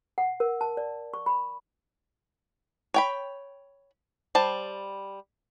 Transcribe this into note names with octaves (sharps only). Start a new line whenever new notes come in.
F#5
A#4
A5
D5
C#6
B5
C#5 G5 B5
G3 C5 A5